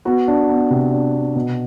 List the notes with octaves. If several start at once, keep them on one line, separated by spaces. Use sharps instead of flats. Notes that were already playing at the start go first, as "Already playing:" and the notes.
B3 F#4
D4
B3
C3
D4
B3
B2